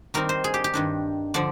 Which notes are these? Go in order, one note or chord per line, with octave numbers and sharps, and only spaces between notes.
D#3 G3 C4 D#4 A#4
C5
G#4
G4
G4
G2 D#3 G3 D4
D3 F3 D5